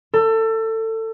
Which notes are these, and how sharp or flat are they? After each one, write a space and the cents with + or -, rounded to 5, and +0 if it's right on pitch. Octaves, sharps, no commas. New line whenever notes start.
A4 +25